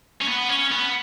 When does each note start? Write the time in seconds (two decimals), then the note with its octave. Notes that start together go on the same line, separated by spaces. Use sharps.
0.21 C#4
0.28 B3
0.50 C#4
0.71 B3